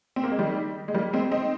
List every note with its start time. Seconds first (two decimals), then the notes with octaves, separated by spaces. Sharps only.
0.16 C4
0.24 A#3
0.31 G#3
0.39 D#3 G3
0.88 G#3
0.94 G3 A#3
1.13 G#3 C4
1.32 C4 D#4